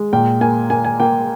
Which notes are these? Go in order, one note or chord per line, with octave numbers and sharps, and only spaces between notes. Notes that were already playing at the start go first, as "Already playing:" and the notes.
Already playing: G#3
A#2 G5
A#3 G#5
A#3 G#5
G#5
A#3 G5